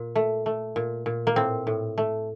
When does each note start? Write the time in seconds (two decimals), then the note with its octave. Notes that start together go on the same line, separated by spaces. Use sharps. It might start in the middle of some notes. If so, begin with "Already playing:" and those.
Already playing: A#2
0.15 A3
0.46 A3
0.76 A#2
1.06 A#2
1.27 A#3
1.36 A2 C4
1.67 A2
1.98 A3